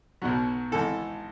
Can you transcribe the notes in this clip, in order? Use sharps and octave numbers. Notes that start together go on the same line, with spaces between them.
B1 B2 F#3
G#1 G#2 E3 A4